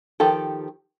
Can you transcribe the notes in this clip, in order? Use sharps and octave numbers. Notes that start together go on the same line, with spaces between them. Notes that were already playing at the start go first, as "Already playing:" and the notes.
D#3 F3 G4 A4